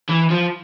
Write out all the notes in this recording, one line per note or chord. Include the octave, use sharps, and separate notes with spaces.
E3
F3